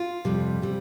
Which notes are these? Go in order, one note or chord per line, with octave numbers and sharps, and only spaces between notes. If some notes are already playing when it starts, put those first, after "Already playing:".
Already playing: F4
F2 C3 G3
C3 G3